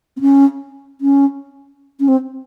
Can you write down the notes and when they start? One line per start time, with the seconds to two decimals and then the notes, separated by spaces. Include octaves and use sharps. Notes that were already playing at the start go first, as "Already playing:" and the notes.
0.17 C4
0.21 C#4
1.01 C#4
2.00 C#4
2.08 C4